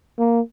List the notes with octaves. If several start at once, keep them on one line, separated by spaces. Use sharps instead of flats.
A#3